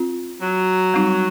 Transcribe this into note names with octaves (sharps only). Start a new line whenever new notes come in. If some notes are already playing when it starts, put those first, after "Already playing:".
Already playing: C4 F4
F#3
G3 C4 D#4